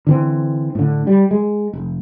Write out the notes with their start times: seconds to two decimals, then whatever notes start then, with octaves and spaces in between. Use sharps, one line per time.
0.07 D3 E3 C4
0.75 A2 D3
1.07 G3
1.31 G#3
1.73 F1